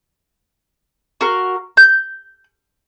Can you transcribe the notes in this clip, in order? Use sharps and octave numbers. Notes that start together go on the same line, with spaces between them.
F#4 A#4 F5
G6